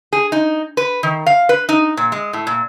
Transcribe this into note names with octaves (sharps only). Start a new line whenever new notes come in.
G#4
D#4
B4
D#3
F5
B4
D#4
A#2
G#3
A2
A#2